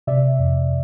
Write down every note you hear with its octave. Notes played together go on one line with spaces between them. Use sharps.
C3 D5 E5
F2